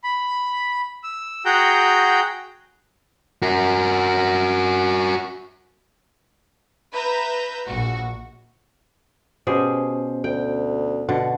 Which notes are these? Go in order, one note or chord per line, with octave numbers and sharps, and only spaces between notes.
B5
E6
F#4 G#4 F#5 G5 A#5 G6
F#4 A#4
B4 E5 A#5 G6
A#1 F#4
B2 C#4 G4 G#4 C5
D2 G5
B2 D3 F#5